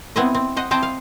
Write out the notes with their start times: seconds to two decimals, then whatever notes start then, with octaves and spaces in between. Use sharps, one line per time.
0.16 B3 C4 E4 C5 D#5
0.35 C4
0.56 C5 D#5 F#5
0.71 C4 E4 C5 D#5 G5 A5
0.83 F5